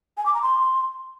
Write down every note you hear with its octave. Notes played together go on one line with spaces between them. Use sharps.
G#5
D6
A#5
C6